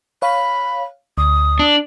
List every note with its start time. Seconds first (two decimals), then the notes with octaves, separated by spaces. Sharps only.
0.22 C#5 F5 B5
1.18 D2 D#6
1.59 D4